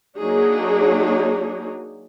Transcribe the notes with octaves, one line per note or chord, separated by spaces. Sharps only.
F#3 A#3 D4 D#4 G#4 C#5